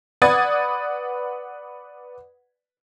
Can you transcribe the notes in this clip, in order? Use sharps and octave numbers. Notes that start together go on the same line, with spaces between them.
B4 D5 F#5 D#6 G#6 A6